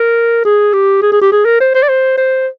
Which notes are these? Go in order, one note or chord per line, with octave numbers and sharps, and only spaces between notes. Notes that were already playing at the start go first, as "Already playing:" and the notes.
Already playing: A#4
G#4
G4
G#4
G#4
G4
G#4
A#4
C5
C5
D5
C5
C5